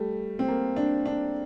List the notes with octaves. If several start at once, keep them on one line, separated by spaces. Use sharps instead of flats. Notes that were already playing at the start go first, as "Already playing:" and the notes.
Already playing: G3 A3
C4
A#3
D4
D4